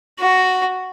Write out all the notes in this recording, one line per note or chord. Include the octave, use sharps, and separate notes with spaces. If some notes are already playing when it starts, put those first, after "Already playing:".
F#4